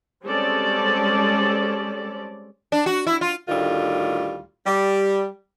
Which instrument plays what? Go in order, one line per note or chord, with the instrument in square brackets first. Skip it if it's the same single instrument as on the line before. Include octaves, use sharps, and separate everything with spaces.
[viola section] G3 G#3 C4 C#4 A4 D5
[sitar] D4
F#4
E4
F4
[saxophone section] D2 A2 D#3 G3 F4
G3